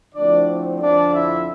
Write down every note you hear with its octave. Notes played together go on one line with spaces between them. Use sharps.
D3 F3 A3 C4 D4 E4 D5
F2 D3 F3 C4 D4 F4 D5
E4 E5